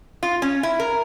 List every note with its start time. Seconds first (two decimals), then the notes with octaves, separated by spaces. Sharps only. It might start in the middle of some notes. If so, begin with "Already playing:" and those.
0.23 F4
0.42 C#4
0.63 E4
0.80 A#4